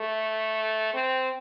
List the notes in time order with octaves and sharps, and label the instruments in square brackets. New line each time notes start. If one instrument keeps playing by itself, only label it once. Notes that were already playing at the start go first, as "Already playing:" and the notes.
Already playing: [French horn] A3
C4